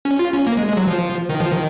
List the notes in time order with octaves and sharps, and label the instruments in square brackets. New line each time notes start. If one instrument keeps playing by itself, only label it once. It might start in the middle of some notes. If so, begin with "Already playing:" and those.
[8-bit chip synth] C#4
F4
C#4
A#3
G#3
G#3
F#3
F3
D#3
F3
D#3